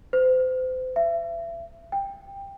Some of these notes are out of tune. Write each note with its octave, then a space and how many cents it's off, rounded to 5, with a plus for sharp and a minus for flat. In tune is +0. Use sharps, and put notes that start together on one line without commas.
C5 -35
E5 +35
G5 +15